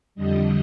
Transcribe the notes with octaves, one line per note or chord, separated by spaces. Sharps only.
F2 D3 G3 D#5